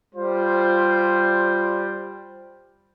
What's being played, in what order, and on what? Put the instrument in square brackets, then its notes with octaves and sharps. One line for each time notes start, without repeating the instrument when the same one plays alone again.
[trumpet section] G3 F4 C5